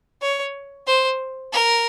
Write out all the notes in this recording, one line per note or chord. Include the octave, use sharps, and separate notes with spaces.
C#5
C5
A#4